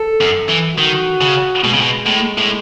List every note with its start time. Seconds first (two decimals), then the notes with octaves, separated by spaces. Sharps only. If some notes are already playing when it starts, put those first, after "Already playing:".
Already playing: A4
0.21 F#2
0.49 E3
0.78 D#3 F#4
1.21 C#3
1.64 B2 G#3
1.73 C#3
1.82 B2
2.06 A2
2.38 A2